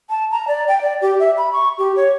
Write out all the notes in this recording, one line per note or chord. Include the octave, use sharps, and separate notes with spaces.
A5
A#5
D5
G5
D5
G4
E5
B5
C#6
G4
C#5